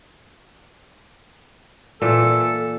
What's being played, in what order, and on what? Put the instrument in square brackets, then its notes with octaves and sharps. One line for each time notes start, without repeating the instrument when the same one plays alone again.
[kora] A#2 E3 [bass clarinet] A4